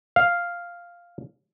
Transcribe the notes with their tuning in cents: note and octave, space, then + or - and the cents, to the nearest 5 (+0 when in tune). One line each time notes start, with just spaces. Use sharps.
F5 +0